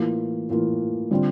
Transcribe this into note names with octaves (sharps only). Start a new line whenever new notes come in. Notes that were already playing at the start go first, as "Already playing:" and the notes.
Already playing: A2 E3 A#3 F4
A2 E3 A#3 F4
D3 G3 C4 F4